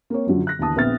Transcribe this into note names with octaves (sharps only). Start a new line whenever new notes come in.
A#3 C4 C#5
F#2 D3 F3 F#3
F#6 A#6
D#2 D3 E3 A5 D#6
A#1 B3 C4 E5 F6 A6